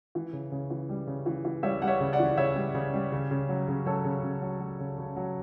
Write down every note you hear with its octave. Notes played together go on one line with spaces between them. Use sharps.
E3
C#3
C#3
E3
G3
C#3
E3
E3
G3 C#5 E5
G3 F#5
C#5 E5
C#3
D5 F#5
E3
C#3 C#5 E5
G3
C#3
G3
C#3
C#3
F#3
C#3
F#3 A4 C#5
C#3
C#3
F#3
F#3
C#3
C#3
F#3